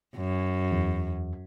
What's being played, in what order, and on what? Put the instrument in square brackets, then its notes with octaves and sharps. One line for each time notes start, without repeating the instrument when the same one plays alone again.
[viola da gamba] F#2
[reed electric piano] E2